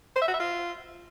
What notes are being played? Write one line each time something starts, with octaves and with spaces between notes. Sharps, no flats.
C5
E5
F#4
E5
F4